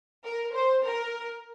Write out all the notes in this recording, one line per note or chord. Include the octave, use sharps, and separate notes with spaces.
A#4
C5
A#4